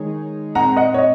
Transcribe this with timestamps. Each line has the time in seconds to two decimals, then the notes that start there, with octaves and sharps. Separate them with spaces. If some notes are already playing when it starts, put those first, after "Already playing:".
Already playing: D#3 G#3 D#4 G#4 C#5
0.55 A#2 G#3 C4 F#5 A#5
0.76 D#5 F#5
0.94 C#5
0.99 D#5